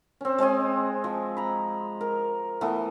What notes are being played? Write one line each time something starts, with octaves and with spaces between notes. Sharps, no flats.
C4 C#4
G#3 C4 D#5 G#5
F3
A#5 B5
A#4
E3 A3 B3